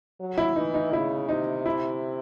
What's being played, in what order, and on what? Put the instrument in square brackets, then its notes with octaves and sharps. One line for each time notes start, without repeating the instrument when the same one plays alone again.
[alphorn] F#3
[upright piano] E4
[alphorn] E3 [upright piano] D#4
[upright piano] D#4
[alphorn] C#3 [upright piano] E4
[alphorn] C3 [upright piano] D#4
[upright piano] E4